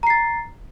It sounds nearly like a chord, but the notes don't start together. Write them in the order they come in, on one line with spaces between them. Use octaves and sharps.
A#5 C7 A6